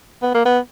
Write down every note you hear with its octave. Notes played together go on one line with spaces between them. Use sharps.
B3
A#3
B3